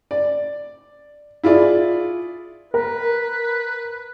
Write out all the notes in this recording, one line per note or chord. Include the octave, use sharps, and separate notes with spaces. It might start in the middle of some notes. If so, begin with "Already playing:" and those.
D5
E4 F4 G#4 D5
A#4 B4